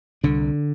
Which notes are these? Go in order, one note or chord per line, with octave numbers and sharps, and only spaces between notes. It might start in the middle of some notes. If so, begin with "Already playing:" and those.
C2 D3 D4